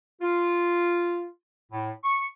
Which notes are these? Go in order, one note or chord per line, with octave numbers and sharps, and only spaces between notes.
F4
A2
C#6